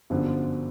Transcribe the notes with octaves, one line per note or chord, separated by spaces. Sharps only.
G1 F#2 D3 F3